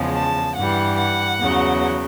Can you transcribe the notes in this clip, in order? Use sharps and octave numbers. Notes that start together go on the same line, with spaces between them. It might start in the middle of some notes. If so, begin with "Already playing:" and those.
Already playing: E2 C#3 F3 G#3
A5
G2 E3 G3 F#5
F#5
E2 C#3 F#3